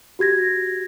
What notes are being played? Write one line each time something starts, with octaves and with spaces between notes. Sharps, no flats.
F#4 G4 G#6 A#6